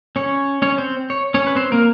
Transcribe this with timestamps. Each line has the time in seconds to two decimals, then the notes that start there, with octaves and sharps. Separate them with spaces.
0.16 C#4 C#5
0.62 C#4 C#5
0.78 C4 C5
1.10 C#5
1.34 C#4 C#5
1.47 B4
1.56 C4 C5
1.72 A#3 A#4